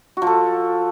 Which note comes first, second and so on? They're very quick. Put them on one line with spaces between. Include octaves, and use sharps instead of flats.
F#4 F3 A4